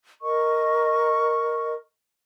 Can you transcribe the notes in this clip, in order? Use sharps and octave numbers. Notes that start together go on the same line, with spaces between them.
A#4 D#5 C#6